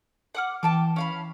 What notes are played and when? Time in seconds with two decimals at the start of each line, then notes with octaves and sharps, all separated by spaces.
0.35 F#5 D6 F6
0.63 E3 G5 A5 D6
0.96 C#4 F5 B5